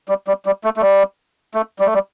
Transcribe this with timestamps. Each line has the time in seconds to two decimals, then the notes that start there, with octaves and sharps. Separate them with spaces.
0.09 G3
0.28 G3
0.46 G3
0.64 A3
0.77 A3
0.82 G3
1.54 A3
1.79 G3
1.86 A3
1.94 G3